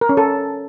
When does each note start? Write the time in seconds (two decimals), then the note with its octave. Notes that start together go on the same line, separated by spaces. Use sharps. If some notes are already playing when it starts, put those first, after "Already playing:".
0.01 A#4
0.09 C#4
0.17 A4